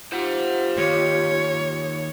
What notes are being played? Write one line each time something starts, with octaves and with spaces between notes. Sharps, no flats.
F4 G4 C5 F#5
D#2 C#5